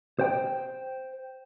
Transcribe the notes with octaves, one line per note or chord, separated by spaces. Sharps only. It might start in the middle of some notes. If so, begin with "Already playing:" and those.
C5 G5